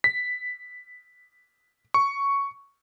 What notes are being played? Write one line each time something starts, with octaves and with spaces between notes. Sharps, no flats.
B6
C#6